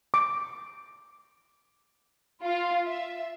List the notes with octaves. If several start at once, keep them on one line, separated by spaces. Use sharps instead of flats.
D6
F4
E5